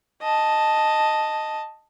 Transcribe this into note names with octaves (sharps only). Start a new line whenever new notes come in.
D#5 A5